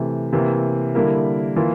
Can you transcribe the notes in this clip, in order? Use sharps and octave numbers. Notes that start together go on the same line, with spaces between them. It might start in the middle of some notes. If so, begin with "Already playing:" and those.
Already playing: C3 E3 A3
C3 E3 A#3
D3 G3 A#3 E4 A#4
E3 A#3 F4